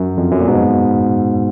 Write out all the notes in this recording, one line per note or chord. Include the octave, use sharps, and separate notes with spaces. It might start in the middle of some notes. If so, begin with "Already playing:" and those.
Already playing: F#2
F2
F#2
A#2
G#2 B2